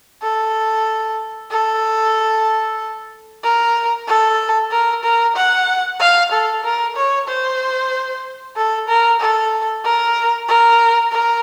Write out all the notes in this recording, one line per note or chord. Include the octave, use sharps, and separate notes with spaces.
A4
A4
A#4
A4
A#4
A#4
F#5
F5
A4
A#4
C#5
C5
A4
A#4
A4
A#4
A#4
A#4